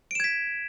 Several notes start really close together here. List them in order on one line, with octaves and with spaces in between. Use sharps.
D7 E7 G#6 B6